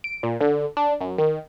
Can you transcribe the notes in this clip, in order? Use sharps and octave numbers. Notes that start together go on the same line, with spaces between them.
D7
A#2
D3
D4
F#2
D#3